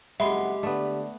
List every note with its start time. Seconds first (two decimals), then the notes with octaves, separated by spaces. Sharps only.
0.20 F#1 F2 G#3 G4 E5 F#5 B5
0.63 D3 A3 B3 D5